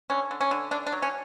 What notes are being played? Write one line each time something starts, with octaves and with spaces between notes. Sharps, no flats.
D3 C#4
D3
C#4
D3
D3 D4
D4
F#3
C#4